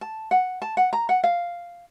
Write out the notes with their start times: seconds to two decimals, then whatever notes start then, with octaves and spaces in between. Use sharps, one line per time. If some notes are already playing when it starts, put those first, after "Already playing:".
0.01 A5
0.31 F#5
0.62 A5
0.77 F#5
0.93 A#5
1.09 F#5
1.23 F5